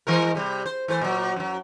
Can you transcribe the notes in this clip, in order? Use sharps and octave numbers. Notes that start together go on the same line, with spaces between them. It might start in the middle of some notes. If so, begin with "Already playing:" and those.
E3 G#3 A#4
C3 G3
C5
E3 A3 C5
A#2 F#3
F#2 F#3